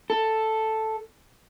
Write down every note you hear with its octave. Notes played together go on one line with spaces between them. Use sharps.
A4